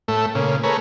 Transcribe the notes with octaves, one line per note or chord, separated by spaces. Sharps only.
A2 A3
A#2 C#3
A3 G#4 A#4 B4 C#5